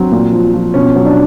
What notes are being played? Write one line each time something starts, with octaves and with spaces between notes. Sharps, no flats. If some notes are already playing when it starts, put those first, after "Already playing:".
Already playing: F#3 C4
A#2
F3
F3
B2 C#4
F#3
D4